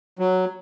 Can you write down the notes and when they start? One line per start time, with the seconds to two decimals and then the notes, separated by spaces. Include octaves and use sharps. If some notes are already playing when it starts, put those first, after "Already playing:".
0.19 F#3